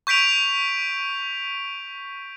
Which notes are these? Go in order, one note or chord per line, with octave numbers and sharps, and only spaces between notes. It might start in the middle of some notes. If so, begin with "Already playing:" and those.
C#6 G6 B6 D7 F7